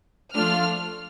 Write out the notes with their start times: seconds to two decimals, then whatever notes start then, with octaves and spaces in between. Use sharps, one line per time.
0.33 F3 A3 D4 F4 F6